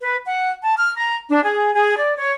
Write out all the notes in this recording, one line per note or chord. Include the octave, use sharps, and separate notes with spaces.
B4
F#5
A5
F6
A#5
D4
G#4
G#4
D5
C#5